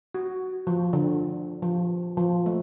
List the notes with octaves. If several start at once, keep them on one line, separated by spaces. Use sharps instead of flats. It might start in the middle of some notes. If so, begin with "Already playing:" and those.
F#4
F3
D3
F3
F3
A3